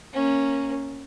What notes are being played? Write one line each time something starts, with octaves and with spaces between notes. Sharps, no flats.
A#3 C#4